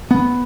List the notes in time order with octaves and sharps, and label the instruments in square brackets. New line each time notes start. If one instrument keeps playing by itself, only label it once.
[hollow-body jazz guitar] B3